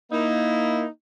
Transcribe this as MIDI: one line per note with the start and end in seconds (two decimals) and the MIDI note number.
0.12 0.85 58
0.12 0.85 63
0.12 0.85 64